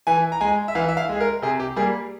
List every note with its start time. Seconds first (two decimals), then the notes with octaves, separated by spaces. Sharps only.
0.07 E3 G#5
0.32 A#5
0.41 G#3 G#5
0.68 E5
0.75 E3 F5
0.88 E5
0.97 F5
1.09 G#3 G#4
1.21 A#4
1.42 C3 G#4
1.60 G4
1.76 G3 A#3 G#4